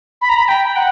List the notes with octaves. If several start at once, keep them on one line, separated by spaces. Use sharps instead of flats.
B5
A#5
B5
G5
F#5